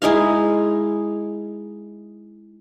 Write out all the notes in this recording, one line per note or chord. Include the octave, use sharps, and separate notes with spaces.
G#3 D#4 E4 F5